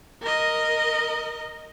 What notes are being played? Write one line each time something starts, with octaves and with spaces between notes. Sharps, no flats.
A#4 D#5